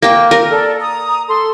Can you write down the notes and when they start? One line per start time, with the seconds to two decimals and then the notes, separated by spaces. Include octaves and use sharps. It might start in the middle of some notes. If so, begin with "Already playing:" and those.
0.02 A#3 G5
0.31 A#4
0.50 A4 D5
0.80 A#5 D#6
1.28 A4 C6